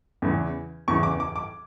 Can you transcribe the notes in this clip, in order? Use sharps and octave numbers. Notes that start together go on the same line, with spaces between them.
E2 C#3 E3
E2 C#3 E3 C#6
D6
D6
D6